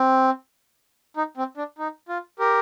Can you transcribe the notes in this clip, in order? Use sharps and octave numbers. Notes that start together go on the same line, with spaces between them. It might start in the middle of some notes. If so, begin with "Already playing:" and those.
Already playing: C4
D#4
C4
D4
D#4
F4
G4 A#4